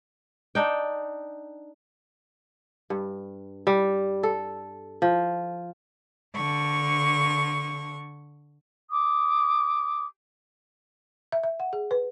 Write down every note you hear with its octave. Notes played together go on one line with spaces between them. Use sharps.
D4 D#4 G5
G2
G3
A4
F3
D3 C#6
D6 D#6
E5
E5
F#5
G#4
B4